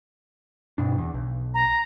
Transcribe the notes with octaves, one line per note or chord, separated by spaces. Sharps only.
G2 B2 D4
E2
B1
A#5